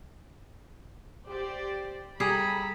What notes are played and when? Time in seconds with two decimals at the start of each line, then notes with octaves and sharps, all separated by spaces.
1.27 G4 C5 D5
2.20 G3 G#4 A4 A#5 B5